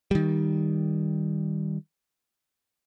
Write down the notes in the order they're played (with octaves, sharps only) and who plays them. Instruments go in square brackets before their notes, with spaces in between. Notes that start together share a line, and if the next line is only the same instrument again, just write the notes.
[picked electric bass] D#3 G3